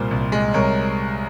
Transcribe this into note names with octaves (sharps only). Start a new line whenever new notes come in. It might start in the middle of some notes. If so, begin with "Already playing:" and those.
Already playing: C2 A#2 G3 C5
C2
G#3
C2 A#4 C#5